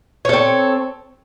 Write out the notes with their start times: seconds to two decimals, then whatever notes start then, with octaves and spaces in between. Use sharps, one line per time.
0.25 C#5
0.29 A4
0.33 C4